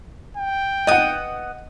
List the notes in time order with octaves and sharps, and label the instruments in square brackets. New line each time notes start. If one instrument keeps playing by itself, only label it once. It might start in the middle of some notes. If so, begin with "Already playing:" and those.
[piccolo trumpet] G5
[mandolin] B3 D#6 [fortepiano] D#5 F#5